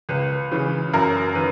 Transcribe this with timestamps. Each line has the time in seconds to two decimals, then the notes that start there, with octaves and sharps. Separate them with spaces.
0.09 C#2 B4
0.51 C#3 E3
0.93 F#2 A#4
1.35 D#3 B4